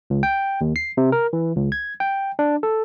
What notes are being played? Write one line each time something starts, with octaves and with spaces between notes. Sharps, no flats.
C#2
G5
D#2
C7
C3
A#4
E3
C#2
G#6
G5
D4
A4